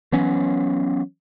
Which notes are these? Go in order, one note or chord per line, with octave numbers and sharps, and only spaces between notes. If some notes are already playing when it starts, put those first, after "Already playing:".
E3 F#3 B3 C#4